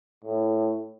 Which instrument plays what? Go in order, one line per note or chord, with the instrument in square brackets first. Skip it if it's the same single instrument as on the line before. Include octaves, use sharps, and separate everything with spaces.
[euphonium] A2